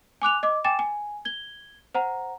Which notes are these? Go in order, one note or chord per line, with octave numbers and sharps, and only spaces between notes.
G#5 D6 F#6 F7
D#5 D6
G5 G#5 D6 A6 E7
G#5
G#6 G7
C5 F#5 A#5